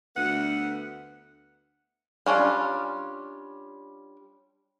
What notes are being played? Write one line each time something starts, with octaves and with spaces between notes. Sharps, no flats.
D2 B3 F#5
G3 C#4 D4 F4